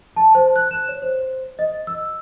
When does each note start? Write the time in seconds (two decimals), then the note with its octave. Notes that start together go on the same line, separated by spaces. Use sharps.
0.16 A5
0.35 C5
0.56 F#6
0.71 E7
0.88 C#5
1.02 C5
1.59 D#5
1.87 E6